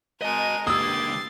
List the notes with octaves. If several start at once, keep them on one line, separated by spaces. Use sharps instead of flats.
G#3 A#4 D#5 A5 D#7
C#2 G2 A#3 G4 D#6 E6 A6 C7